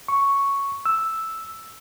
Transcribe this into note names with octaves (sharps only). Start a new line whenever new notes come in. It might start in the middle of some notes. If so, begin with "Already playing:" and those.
C#6
E6